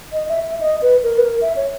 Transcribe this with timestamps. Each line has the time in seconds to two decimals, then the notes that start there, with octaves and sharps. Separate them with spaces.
0.12 D#5
0.29 E5
0.44 E5
0.61 D#5
0.82 B4
1.03 A#4
1.17 B4
1.25 A#4
1.41 E5
1.56 C#5